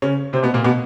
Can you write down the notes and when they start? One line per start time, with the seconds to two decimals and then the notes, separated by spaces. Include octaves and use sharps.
0.02 C#3 C#4
0.33 C3 C4
0.43 B2 B3
0.54 A#2 A#3
0.64 B2 B3